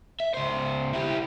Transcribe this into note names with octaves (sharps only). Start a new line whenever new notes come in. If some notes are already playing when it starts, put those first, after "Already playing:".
E5
C#2 C5
E4 G4